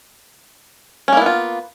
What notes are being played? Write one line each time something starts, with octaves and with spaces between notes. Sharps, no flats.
A#3 B3 C#4 E4 F4